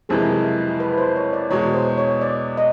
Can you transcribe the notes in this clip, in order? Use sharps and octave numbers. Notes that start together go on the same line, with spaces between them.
F#1 F2 C3 E3 G#3 G#4
B4
C5
C#5
D5
E2 B2 G#3 C#5
C5
C#5
D5
D#5